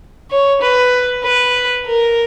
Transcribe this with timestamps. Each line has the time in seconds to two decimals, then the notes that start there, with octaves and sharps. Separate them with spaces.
0.31 C#5
0.62 B4
1.24 B4
1.86 A#4